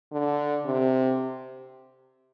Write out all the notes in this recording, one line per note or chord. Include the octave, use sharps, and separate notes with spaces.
D3
C3